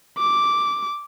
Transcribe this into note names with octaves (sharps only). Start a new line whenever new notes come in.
D6